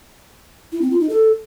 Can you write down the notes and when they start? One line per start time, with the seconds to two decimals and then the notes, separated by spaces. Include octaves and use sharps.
0.72 E4
0.81 C4
0.91 F4
1.00 D#4
1.09 A4